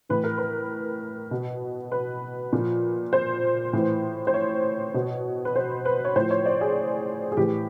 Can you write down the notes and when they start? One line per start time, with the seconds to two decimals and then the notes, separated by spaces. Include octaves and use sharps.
0.09 A2 E3 B4
0.24 A#4
0.38 B4
1.31 B2
1.92 B4
2.53 A#2 F3
3.13 C5
3.73 A2 E3
4.27 C5
4.34 C#5
4.94 B2
5.45 B4
5.56 C5
5.85 B4
6.05 C#5
6.16 A2 F3 C5
6.31 C#5
6.46 D5
6.61 G#4
7.32 G#4
7.37 A2 E3 G4